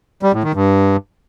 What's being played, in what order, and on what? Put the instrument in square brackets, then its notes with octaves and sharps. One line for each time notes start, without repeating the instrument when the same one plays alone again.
[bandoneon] G3
A2
D#3
G2